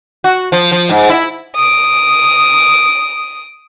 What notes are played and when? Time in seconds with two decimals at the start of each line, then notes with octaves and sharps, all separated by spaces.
0.24 F#4
0.52 F3
0.72 F3
0.90 G#2
1.09 E4
1.56 D#6 D7